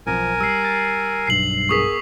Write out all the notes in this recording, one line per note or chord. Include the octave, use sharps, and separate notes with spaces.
B1 F3 C4 A#4 G#5
G3 E6 C7
A6
B1 G2 C7 F#7
B3 G#4 A#4 C#6 D#6 B6